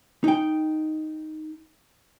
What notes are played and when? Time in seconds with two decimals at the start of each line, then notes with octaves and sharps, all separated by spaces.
0.24 D#4 G5